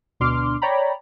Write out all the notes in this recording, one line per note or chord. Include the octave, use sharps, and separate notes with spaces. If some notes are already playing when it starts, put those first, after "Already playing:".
D2 B2 D4 C6 D6 F6
C#5 D5 G5 A#5 B5